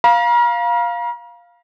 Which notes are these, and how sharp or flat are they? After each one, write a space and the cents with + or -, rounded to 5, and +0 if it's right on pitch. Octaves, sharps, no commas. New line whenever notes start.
F5 +0 A#5 +45